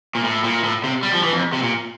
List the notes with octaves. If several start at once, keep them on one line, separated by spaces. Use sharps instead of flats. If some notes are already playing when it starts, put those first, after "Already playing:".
A#2
A2
A#2
A2
C3
G3
F3
E3
F2
C3
A#2